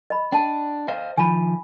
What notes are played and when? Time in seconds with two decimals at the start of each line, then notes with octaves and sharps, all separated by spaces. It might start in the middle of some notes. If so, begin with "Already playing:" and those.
0.10 D#5 B5
0.32 D4 G5 A5
0.88 C5 D#5 F5
1.17 D#3 F3 G#5 B5